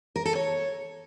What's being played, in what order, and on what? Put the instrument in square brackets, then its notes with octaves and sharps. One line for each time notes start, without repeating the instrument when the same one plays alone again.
[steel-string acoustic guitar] A#4
A4
C#5